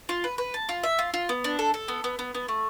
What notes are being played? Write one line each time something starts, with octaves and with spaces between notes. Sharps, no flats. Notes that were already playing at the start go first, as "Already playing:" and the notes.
F4
B4
B4
A5
F4
E5
F4
F4
B3
D4
A4
A4
B3
B3
B3
B3
A3